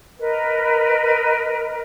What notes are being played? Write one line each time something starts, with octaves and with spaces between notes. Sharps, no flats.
A#4 B4 D#5